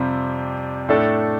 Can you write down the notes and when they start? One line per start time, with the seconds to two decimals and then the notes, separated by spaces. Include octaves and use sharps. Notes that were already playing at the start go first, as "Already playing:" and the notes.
Already playing: F2 C3 G3 C4 F4
0.89 A2 A3 D4 A4